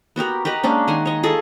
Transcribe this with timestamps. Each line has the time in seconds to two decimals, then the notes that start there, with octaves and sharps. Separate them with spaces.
0.16 B3 F#4 G4 A#4
0.45 G4 A#4 B4 D#5
0.63 G#3 A#3 C#4 D4
0.88 D#3 F#5 G#5 C6
1.06 C#5 D#5
1.23 F4 G#4 A4 D#5